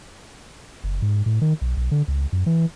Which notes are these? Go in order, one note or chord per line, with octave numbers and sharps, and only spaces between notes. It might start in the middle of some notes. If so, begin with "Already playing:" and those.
F#1
G#2
A2
D#3
B1
B1
D3
C#2
F#2
E3